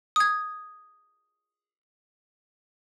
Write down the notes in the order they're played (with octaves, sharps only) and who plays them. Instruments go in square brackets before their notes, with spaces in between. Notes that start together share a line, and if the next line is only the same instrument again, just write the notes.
[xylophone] D#6 G#6